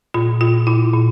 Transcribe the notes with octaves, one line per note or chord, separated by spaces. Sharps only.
A#2 F4
A#2 F4
A#2 E4
A#2